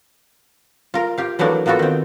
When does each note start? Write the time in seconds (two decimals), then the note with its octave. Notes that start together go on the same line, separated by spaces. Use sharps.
0.94 F4 A#4
1.17 F4 G4 F5
1.39 E3 F#3 A3 A#3 D4
1.66 A#3 B3 F4 F#4 A4
1.79 D#3 C4